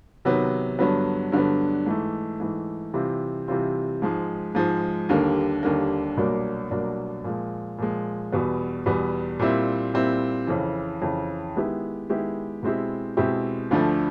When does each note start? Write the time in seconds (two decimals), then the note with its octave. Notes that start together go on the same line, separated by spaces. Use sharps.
0.25 C3 D#3 F#3 B3
0.79 G2 D3 F#3 B3
1.32 G2 D3 F#3 B3
1.86 G#2 E3 A3
2.40 G#2 E3 A3
2.94 C3 E3 G3 C4 F4
3.48 C3 E3 G3 C4 F4
4.02 G#2 F3 G#3
4.55 G#2 F3 G#3
5.09 D#2 D3 G3 A#3
5.63 D#2 D3 G3 A#3
6.17 C2 B2 F#3 A#3 D4
6.70 C2 B2 F#3 A#3 D4
7.24 A#2 F3 G#3
7.78 A#2 F3 G#3
8.32 E2 B2 G3 B3
8.86 E2 B2 G3 B3
9.39 A#2 G3 C4 E4
9.94 A#2 G3 C4 E4
10.47 F2 C#3 E3
11.02 F2 C#3 E3
11.55 D#3 G#3 B3 E4 G4
12.09 D#3 G#3 B3 E4 G4
12.63 B2 G#3 C4 E4 G4
13.17 B2 G#3 C4 E4 G4
13.71 D2 D3 F3 A3